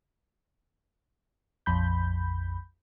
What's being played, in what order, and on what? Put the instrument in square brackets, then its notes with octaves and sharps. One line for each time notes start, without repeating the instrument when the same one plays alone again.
[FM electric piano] A#1 F2 B5 G6